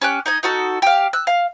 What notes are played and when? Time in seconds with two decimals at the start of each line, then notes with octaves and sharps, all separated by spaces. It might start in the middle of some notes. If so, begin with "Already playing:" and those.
0.02 C#4 G4 F#6
0.26 D#4 D#5 G#5
0.43 D#4 F#4 A4
0.82 G4 F5
1.13 E6 F#6
1.27 F5